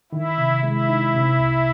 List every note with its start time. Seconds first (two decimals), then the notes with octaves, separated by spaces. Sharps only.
0.12 D#3 E4
0.38 C3
0.63 G#3 E4
0.89 D#4
1.14 C3
1.39 C2